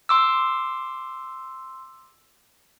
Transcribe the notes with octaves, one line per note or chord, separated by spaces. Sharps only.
C6 D6 E6